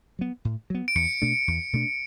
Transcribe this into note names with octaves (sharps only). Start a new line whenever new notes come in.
F#3 B3
A2
F#3 B3
D7
E2 C#7
B2 A3 D4
E2
B2 A3 D4